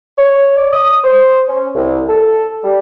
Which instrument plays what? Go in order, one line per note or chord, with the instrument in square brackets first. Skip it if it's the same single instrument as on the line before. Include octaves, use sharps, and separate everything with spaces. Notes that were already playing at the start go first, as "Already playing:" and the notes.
[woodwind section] C#5
D5
D#6
C5
C#4
C2
A4
G3